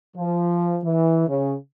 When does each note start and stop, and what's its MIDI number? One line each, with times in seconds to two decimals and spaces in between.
0.16 0.78 53
0.84 1.28 52
1.28 1.55 49